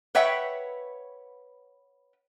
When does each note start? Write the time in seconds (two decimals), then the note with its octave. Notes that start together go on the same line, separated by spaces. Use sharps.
0.15 B4 C#5 E5 F#5 G5